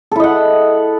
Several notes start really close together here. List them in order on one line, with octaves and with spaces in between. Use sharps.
A4 E4 D#5 F#5